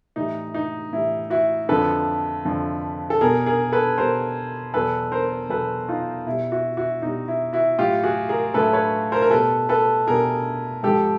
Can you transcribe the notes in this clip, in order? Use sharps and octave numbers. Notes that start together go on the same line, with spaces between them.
A2 E3 G3 D#4
D#4
A2 E3 G3 E4
E4 F#4
F2 D3 F3 A4 B4
F2 D3 F3
A4
B2 G3 G#4 A#4
G#4 A#4
A4 B4
B2 G3 A#4 C5
E2 B2 F#3 A4 B4
A#4 C5
E2 B2 F#3 A4 B4
D#4 F4
B2 G3 E4
E4 F#4
E4 F#4
B2 G3 D#4
E4
E4 F#4
A2 F#3 F4 G4
F#4 G#4
G#4 A#4
A2 F#3 A4 B4
B4 C#5
A#4 C5
A#4
B2 G3 A4 B4
A4 B4
B2 G3 G#4 A#4
G#2 F3 G4 A4